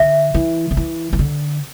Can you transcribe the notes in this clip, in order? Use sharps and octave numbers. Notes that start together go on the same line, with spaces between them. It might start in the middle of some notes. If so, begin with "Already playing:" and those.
Already playing: D3 E5
E3
D3
E3
E3
D3